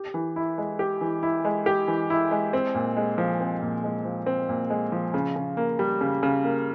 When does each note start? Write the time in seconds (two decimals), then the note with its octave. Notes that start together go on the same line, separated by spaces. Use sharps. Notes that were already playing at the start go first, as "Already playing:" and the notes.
Already playing: G4
0.14 E3
0.36 E4
0.58 G#3
0.79 G4
1.01 E3
1.23 E4
1.45 G#3
1.66 G4
1.88 E3
2.10 E4
2.31 G#3
2.53 C4
2.75 A#2
2.97 G#3
3.18 F3
3.40 C4
3.62 A#2
3.84 G#3
4.05 F3
4.26 C4
4.49 A#2
4.70 G#3
4.92 F3
5.14 C#3
5.36 C#3
5.57 A#3
5.79 G3
6.01 C#3
6.23 C#3
6.44 A#3